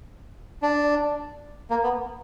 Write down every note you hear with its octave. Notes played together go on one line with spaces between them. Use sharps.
D4
A#3
B3